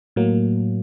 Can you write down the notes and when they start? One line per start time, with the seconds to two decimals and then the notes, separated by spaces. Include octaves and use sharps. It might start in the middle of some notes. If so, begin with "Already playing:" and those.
0.16 A2 F#3 A#3